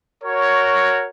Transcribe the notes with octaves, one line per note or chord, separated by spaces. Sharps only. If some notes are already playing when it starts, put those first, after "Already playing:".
F#4 A#4 C#5